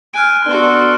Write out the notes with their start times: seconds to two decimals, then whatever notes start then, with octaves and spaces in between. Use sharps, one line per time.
0.14 G#5 F6 F#6 D7
0.46 B3 D4 F#4 A4 C6